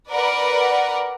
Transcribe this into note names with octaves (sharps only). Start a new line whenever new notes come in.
A#4 B4 D5 F#5